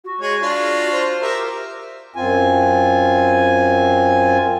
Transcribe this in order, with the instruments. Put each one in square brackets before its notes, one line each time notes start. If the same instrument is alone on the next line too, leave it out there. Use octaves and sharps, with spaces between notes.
[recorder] F#4
[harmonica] G#3 C#5
D4 F4
[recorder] C5
[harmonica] G4 A#4 E5
[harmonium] F#2 C4 F4 G#5